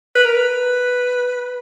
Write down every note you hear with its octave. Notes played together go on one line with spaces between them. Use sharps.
B4
A#4
B4